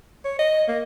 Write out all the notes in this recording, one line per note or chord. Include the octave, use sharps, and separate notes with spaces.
C#5
D#5
A#3